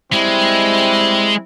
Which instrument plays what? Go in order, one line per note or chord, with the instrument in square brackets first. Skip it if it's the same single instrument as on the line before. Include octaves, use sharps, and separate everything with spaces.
[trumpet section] G3 C4 E4 [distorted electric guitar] G#3